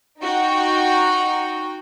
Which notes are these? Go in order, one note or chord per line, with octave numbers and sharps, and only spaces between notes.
D#4 F#4 G5